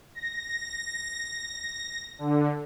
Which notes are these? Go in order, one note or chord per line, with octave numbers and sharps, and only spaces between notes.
A#6
D3